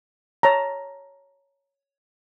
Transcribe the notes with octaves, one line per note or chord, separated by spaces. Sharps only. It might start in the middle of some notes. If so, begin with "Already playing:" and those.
C#5 A5 A#5